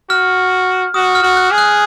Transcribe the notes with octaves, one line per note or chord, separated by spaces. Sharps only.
F#4 F6
F#4 D#6
F6
F#4
F#6
G#4
F#6